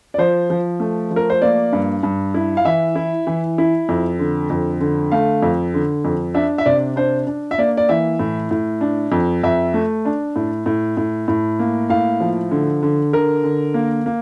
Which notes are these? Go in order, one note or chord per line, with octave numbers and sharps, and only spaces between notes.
D5
F3 C5
F3
A3
F3
A#4
C5
A#3 D5
G2
G2
E4
F5
E3 E5
E4
E3
E4
F2
D3
F2
D3
A3 F5
F2
D3
F2
D4 E5
E5
C3 D5
D4 C5
D4
E5
A#3 D5
D5
E3 E5
A2
A2
D4
F2
F2 E5
A3
D4
A2
A2
A2
A2
A#3
A2 F5
F3
D3
D3
D3 A#4
D3
A#3
A#3